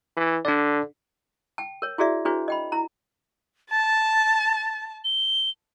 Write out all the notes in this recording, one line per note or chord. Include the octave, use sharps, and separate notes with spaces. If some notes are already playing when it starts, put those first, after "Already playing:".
E3
D3 D4 D5
G5 A5
A#4 C#5
E4 F#4 G#4 D5 E5
D4 E4 F#4 G#4 B4 C#5
D#5 G5 B5
E4 A#5
A5 A6
G7